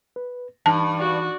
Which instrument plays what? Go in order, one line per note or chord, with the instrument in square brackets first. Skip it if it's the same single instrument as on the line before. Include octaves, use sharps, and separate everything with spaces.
[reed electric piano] B4
[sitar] G2 [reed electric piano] E3 D#4 [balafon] A5
[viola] F#4 D5